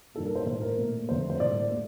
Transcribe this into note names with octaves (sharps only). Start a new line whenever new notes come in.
G2 D#3 A#3 A4
A#4
C5
A2 A3 C5
A#4
A#2 A3
F2 D3 A3 C5
C5
A2 G3 A#3 D5
A3